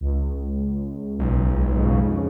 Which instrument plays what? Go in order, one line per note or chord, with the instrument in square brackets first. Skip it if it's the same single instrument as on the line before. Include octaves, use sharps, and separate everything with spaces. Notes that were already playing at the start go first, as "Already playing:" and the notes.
[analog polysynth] C#2
[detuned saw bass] B1
[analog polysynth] F2 G#2 C#3